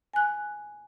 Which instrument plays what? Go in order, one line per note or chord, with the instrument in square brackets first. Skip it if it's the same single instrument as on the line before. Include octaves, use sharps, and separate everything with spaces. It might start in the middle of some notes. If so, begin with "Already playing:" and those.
[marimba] G#5 F#6